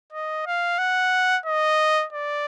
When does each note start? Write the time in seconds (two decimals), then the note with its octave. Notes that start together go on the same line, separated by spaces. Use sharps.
0.12 D#5
0.46 F5
0.79 F#5
1.46 D#5
2.13 D5